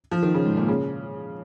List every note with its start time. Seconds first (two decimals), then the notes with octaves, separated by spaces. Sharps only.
0.11 F3
0.23 D#3
0.35 C#3
0.46 G#2
0.57 A#2
0.68 C#3